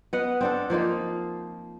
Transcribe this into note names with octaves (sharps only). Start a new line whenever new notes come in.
B3 D#5 F#5
C4 D4 A4
F3 A#3 D#4 F4